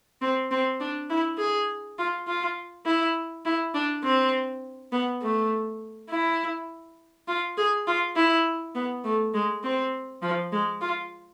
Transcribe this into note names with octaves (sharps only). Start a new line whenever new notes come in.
C4
C4
D4
E4
G#4
F4
F4
E4
E4
D4
C4
B3
A3
E4
F4
G#4
F4
E4
B3
A3
G#3
C4
F3
G#3
F4